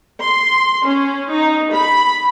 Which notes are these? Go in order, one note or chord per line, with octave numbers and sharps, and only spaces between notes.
C6
C#4
D#4
B5